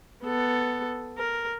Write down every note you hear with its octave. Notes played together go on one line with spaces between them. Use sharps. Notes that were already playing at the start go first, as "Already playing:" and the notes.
B3 A4
A#4